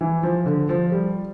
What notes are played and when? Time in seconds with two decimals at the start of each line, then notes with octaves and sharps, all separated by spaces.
0.01 E3
0.23 F3
0.46 D3
0.69 F3
0.92 G3